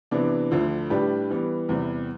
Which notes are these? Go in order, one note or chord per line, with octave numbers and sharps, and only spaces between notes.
C3 E3 B3 D4
D2 D3 F3
A2 G3 D4 G4 B4
E3 G3 B3
E2 C3 G3